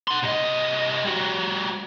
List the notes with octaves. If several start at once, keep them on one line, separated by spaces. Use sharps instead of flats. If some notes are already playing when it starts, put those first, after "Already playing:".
F#5 C6
C2 D#5
G3 F#4